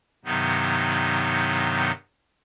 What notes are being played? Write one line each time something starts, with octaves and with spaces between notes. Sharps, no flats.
G2 C3 D#3 F#3 B3 D#4